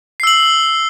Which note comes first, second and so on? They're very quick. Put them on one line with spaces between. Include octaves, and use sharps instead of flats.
C7 E6 F#7